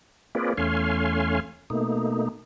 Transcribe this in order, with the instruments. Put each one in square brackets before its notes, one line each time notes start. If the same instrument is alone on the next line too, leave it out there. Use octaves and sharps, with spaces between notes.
[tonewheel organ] A#3 C4 F4 G#4 B4 D5
E2 A3 C#4 F5 G#5 C6
B2 A3 A#3 D#4